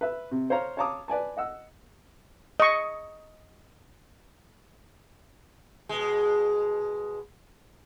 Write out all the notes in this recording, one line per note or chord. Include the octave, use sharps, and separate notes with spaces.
B4 E5
C3
C5 C#5 F5 A#5
C#5 F5 A5 A#5 D6 D#6
B4 D5 G#5 A5
D#5 F#5 E6
D#5 C#6
B2 G#3